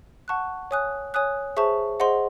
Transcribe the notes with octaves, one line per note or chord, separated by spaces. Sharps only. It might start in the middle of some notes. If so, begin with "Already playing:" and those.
F#5 A5 C#6 F#6
C#5 G#5 D#6 F#6
C#5 G#5 D#6 F#6
G#4 C5 E5 A5 C#6
G#4 C5 D#5 F#5 C6